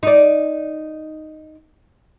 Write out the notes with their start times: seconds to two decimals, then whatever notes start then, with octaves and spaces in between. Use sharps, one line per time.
0.03 D#4 D5